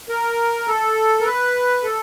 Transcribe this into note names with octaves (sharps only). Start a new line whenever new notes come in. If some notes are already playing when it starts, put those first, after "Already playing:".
A#4
A4
A#4
B4
A4